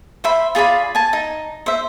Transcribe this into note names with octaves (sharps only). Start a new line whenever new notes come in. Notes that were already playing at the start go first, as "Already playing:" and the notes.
C5 E5 B5
F4 G#4 D5 B5
G#5 A5
D#4
C5 E5